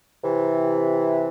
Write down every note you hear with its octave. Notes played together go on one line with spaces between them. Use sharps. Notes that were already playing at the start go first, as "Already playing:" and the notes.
C3 E3